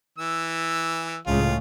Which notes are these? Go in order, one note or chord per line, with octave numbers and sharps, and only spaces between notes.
E3 E6
C#2 A2 C#3 F4